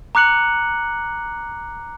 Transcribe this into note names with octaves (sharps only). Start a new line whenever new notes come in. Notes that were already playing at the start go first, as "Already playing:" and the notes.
A#5 D6 F#6 C#7 F#7